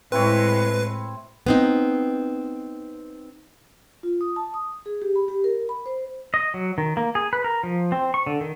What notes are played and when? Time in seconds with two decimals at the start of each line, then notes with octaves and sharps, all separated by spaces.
0.12 A2 G#3 C4 E4 B4 C#5
1.46 B3 C4 D#4
4.03 F4
4.21 D#6
4.36 A5
4.54 D#6
4.86 G#4
5.02 G4
5.16 B5
5.28 G4
5.44 A#4
5.69 B5
5.86 C5
6.34 D#5
6.54 F#3
6.78 D#3
6.97 A#3
7.15 G#4
7.33 B4
7.44 A#4
7.63 F3
7.92 C4
8.14 C#6
8.27 D3
8.41 D#3